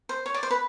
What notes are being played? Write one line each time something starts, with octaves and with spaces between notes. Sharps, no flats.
C5
C#5
D5
C5
B4